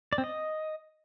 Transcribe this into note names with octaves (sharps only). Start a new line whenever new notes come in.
D5
C4
D#5